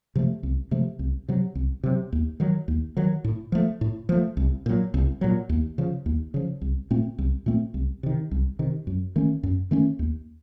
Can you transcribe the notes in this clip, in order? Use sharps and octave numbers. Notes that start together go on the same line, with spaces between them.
C3 F3 A3
C2
C3 F3 A3
C2
C3 F#3
C2
C3 F#3
D#2
D#3 F#3
D#2
D#3 F#3
A2
F3 A3
A2
F3 A3
C2
A#2 F#3
C2
A#2 F#3
D#2
C#3 F3
D#2
C#3 F3
C2
A#2 A3 C4
C2
A#2 A3 C4
C2
C3 D#3
C2
C3 D#3
F#2
D#3 A3 C#4
F#2
D#3 A3 C#4
D#2